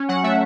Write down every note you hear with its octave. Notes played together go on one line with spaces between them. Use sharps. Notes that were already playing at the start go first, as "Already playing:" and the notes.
Already playing: C#4
F#3 F#5
A3 E5